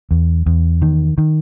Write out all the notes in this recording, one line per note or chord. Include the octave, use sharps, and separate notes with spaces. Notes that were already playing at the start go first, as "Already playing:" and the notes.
E2
E2
D#3
D#3